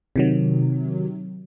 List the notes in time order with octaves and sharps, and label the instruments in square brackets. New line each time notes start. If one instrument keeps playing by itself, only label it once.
[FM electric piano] C3 D#3 F#3